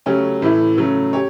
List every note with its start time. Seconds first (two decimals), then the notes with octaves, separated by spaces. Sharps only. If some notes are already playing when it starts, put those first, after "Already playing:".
0.06 C#3 F#3 A3 C#4 G4
0.42 A2 E3 A3 E4
0.78 C#3 F#3 A3
1.13 G4 C#5